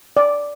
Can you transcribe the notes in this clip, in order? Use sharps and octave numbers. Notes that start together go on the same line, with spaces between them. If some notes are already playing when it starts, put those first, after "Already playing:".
D5